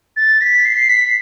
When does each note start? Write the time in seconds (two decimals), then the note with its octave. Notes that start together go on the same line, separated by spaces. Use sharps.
0.16 A6
0.41 B6
0.65 C7
0.89 B6